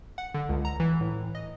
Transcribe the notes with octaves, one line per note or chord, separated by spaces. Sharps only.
F#5
D3
C#2
A#5
E3
A2
D#5